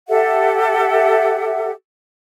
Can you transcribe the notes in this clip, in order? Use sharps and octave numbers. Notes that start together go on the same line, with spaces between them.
G4 A4 E5 F#5